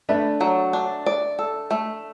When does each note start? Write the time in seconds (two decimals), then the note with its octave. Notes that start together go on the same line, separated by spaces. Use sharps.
0.09 A3 D4 B4
0.41 F#3
0.73 D4
1.06 D5
1.39 A4
1.71 A3